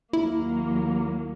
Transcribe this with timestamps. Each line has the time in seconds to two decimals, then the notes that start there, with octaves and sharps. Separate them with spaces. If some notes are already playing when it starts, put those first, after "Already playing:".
0.13 D#2 F#3 A#3 E4